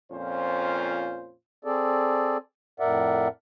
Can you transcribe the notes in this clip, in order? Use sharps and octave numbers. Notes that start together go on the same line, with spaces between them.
F2 A#2 C#4 F4 C5
C4 G#4 A4 D5
F2 A2 A#4 D5 E5 F#5